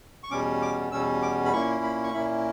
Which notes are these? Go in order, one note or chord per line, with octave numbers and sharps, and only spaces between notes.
C#6
E2 B2 G3 C#4 D6
D6
E2 B2 G3 C#4 E6
D6
B5
A#2 A#3 C#4 E4 C#6
B5
C#6
A#2 A#3 C#4 E4 B5